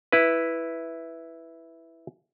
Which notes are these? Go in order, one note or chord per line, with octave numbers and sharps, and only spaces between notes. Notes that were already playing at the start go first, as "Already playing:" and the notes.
E4 B4